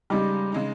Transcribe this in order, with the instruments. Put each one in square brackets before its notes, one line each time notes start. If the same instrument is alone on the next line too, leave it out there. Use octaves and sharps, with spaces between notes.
[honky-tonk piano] C#3 G#3 D#4 [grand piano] G3
[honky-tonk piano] C#3 G#3 D#4